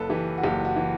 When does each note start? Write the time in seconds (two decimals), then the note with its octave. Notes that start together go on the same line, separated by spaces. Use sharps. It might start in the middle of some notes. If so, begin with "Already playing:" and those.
Already playing: F#1 A4 B4
0.09 E3 G4
0.38 F#4
0.44 F#1 G4
0.65 F#4
0.76 E3